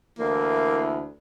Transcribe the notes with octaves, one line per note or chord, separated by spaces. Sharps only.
D2 E3 A#3 E4